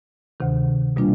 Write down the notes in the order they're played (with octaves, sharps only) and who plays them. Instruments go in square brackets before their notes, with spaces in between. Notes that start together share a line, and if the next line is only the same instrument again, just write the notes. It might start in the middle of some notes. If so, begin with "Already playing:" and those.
[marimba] D2 C3 D#3
B2 G3 A#3 D4 F4